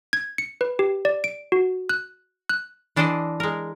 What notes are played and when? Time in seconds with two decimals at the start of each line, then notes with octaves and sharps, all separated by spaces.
0.13 G#6
0.38 C#7
0.61 B4
0.79 G4
1.05 D5
1.24 D7
1.52 F#4
1.89 F#6
2.49 F#6
2.96 E3 D4 A4 C5 D5 D#5
3.40 G#3 A#4